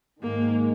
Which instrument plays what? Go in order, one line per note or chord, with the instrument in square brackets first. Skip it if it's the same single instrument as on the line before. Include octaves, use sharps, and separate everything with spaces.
[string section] G#2 D#3 G#3 [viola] A#3